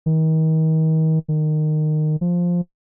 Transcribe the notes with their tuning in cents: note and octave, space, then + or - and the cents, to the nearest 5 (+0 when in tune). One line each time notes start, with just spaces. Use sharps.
D#3 +35
D#3 -20
F3 +5